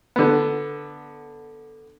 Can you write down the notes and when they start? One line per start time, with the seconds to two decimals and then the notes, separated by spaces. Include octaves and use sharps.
0.16 D3 B3